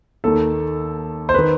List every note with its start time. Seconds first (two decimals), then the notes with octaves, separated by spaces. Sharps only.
0.24 D#2 D#3 A4
1.29 C5
1.34 D#3 B4